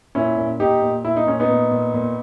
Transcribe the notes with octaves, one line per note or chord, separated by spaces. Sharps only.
A#2 C#4 E4
A#2
A#2 D#4 G4
A#2
A#2 E4
D#4
A#2 C#4
B3 D#4
A#2
A#2
A#2